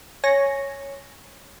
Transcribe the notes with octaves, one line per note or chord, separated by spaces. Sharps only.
C#5 G#5 C#6 A#6